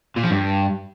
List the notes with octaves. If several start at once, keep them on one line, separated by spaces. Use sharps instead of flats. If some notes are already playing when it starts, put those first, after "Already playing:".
A#2
F3
G2